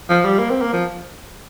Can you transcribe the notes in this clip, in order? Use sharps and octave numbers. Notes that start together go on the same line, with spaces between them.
F3
G3
A#3
C4
A#3
F3